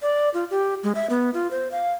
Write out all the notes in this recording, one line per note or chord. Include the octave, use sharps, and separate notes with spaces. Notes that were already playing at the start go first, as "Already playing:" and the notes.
D5
F4
G4
G#3
E5
B3
F4
C5
F5